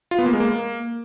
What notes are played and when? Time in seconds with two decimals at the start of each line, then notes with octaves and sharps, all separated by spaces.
0.11 F4
0.19 B3
0.26 A#3
0.33 G#3
0.40 A#3